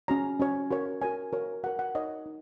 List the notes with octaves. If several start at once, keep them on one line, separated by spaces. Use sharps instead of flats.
C#4 F#4 C#5 A#5
C#4 F#4 C#5
F#4 A#4 C#5
F#4 A#4 C#5 G#5
F#4 A#4 C#5
F#4 A#4 C#5 F#5
F#5
D#4 A#4 C#5 D#5
D#4